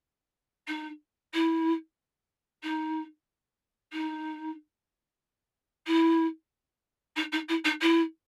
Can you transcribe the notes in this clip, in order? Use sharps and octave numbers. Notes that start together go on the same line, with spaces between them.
D#4
E4
D#4
D#4
E4
D#4
D#4
E4
D#4
E4